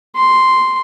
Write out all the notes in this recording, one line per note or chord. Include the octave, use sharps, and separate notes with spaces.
C6